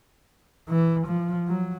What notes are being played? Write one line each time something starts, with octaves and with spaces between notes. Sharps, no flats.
E3
F3
F#3